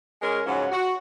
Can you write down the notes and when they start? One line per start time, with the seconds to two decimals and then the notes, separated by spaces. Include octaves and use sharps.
0.22 G#3 C#4 A#4
0.46 G#2 C#3 F3 F#3 C#4 F#5
0.72 F#4